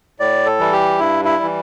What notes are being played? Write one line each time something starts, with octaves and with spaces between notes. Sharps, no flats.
A2 D5
A4
E3 G3
G4
G2 E4
E4
E3 G3